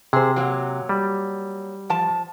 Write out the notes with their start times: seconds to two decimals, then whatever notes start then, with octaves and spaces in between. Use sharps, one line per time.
0.13 C3 G#4 C5
0.36 F#3 A#3
0.89 G3
1.90 F3 A5